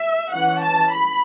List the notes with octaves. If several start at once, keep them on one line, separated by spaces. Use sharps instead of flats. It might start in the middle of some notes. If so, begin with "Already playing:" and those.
Already playing: E5
E3 C#4 F#5
A5
B5